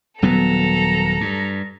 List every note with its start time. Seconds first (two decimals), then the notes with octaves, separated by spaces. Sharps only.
0.22 D#1 F#3 B3 A4 A#5
1.21 G2